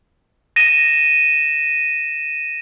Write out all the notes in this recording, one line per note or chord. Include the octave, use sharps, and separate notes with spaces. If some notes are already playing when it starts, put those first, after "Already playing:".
A#6 D#7 E7